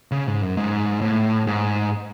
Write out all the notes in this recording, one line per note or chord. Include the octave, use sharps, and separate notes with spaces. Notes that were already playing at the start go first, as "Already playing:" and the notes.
C#3
G#2
F#2
G#2
A2
G#2